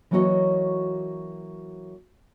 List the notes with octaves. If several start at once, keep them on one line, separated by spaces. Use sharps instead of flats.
E3 F#3 A#3 F#4 C#5 D#5